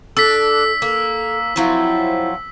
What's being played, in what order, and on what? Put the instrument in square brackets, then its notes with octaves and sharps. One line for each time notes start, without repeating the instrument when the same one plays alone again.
[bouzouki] D4 [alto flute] A4 [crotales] E6 B6
[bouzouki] A#3 [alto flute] A4
[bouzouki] F3 F#3 C4 [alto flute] E4